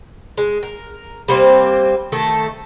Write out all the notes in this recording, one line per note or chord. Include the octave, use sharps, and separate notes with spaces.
G#3
A#4
G3 A#3 C4 C5
D#3 A3 A4